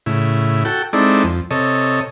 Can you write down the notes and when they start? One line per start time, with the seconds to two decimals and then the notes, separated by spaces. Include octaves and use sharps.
0.06 A2 C#3 E4
0.65 F#4 A4 G5
0.93 G#3 C4 D#4 E4 A4 D5
1.24 F2
1.51 C3 A4 C#5 D#5